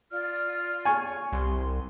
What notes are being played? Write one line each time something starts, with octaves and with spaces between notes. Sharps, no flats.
F4 D5 F6
G#5 C#6
C2 C6